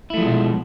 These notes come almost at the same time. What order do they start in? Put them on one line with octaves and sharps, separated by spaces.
E4 A3 F3 G#3 B2